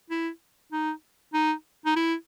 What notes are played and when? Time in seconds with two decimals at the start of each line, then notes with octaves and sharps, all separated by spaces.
0.10 E4
0.72 D#4
1.33 D#4
1.85 D#4
1.96 E4